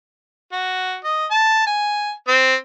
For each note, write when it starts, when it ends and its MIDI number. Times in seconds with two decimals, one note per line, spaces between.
0.52 0.96 66
1.05 1.26 75
1.31 1.66 81
1.67 2.12 80
2.28 2.56 60